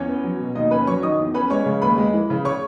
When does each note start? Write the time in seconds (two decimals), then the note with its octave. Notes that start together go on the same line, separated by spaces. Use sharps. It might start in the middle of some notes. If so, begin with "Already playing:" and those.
Already playing: E2 C#4 C#5
0.08 B3
0.24 F#3
0.40 B2
0.55 D#2 D#4 D#5
0.70 C#4 B4 B5
0.87 F#3 C#5 C#6
1.02 D#3 D#5 D#6
1.19 E2
1.34 C#4 B4 B5
1.50 G#3 C#5 C#6
1.66 C#3
1.82 D#2 B4 B5
1.98 G#3
2.13 E3
2.30 C#3
2.45 C#5 C#6